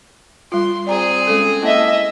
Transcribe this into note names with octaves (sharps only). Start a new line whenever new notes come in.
G3 F4 C6
C4 G#4 D5 A#5
G#3 C#4 A4
A#3 E4 D#5 E5 A5